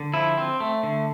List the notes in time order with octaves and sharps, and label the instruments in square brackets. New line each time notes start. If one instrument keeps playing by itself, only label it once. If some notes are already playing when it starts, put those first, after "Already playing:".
Already playing: [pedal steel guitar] D3
F3 E4
C4
A3
D3